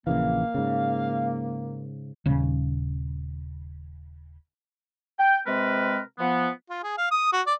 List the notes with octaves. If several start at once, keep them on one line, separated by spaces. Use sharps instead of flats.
A#1 C#3 E3 A#3 F5
G#2 C#3
D#1 C#3
G5
C3 G#3 C4 A#4 B4
F3 B3
F4
G#4
F5
D#6
F#4
D5